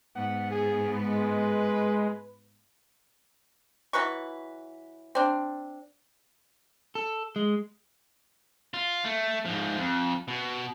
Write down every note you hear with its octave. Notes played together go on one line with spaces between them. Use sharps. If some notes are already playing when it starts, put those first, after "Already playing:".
G#2 B3 F#5
G#4
G#3 B4
E3 F#3 B4 C#6
C4 D4
A4
G#3
F4
A3
G#2 F3
F2
B2